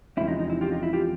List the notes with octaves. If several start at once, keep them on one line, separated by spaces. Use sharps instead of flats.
E2 C3 F3 G#3 C#4 E4
D#4
D#4
E4
F4 G4
D#4 F4
E4
F4 G4